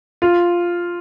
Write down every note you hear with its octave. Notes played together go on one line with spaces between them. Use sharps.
F4